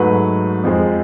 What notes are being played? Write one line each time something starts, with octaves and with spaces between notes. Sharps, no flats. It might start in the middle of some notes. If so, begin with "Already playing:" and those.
Already playing: G#2 F#3 A3 B4
F2 F3 G#3